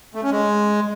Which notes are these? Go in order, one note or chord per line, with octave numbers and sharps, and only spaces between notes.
A3
C#4
G#3